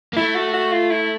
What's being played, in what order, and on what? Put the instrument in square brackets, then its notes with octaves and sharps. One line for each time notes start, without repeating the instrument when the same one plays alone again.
[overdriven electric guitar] A#3
[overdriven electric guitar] A3 [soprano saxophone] E4
[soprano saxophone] F#4
F#4
F4
E4